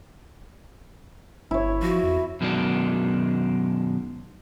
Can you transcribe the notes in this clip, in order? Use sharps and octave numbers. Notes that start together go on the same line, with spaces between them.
G1 E4 C#5
F3 F#4
F2
F#2 B2 D#3 G#3 D4